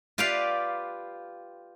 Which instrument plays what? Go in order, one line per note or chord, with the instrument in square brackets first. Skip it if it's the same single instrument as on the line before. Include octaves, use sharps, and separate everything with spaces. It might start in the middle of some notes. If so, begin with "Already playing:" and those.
[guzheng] F4 G4 B4 D5 F5